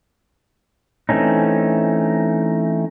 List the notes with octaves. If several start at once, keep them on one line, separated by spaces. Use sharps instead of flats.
E3 A3 C4 C#4 D#4